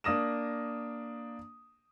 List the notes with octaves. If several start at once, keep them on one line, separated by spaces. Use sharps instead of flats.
A#3 D4 D#6 A#6 E7